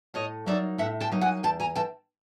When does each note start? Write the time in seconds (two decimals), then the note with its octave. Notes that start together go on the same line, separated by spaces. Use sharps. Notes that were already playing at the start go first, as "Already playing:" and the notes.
0.14 A2 C#5 D#5
0.46 F#3 A#3 D#4 D5 E5
0.78 A2 E5 F#5
1.00 G5 A5
1.12 F#3 A#3 D#4
1.21 F#5 G#5
1.43 E2 G5 A5
1.60 G#5 A#5
1.76 E3 G5 A5